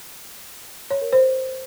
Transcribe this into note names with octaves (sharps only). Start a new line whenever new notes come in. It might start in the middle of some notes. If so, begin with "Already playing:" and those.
C#5
A#4
C5